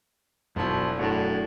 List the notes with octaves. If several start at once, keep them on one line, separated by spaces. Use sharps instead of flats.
E1 F#2 B2 F3 F#3 E4
F#2 A2 D4 F#4